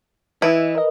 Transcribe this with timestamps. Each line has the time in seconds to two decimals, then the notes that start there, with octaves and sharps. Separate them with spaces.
0.42 E3 E4 B4 D#5
0.75 A#4 D#5